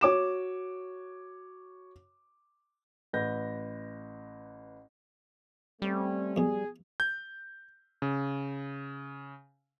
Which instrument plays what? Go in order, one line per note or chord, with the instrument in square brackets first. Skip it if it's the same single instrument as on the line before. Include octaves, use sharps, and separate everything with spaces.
[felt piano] F#4 C#5 D6 E7
[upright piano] A1 B4 G6 A#6
[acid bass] G3 [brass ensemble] A3 C4 C#4
[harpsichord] F2 B2 [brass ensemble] G#4
[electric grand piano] G6
C#3